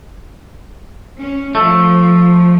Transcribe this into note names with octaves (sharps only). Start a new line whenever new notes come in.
C#4
F3 A3